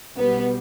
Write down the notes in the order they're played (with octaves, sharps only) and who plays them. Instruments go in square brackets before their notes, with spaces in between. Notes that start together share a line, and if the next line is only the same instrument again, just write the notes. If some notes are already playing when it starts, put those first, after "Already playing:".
[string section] B1 B2 G3 B3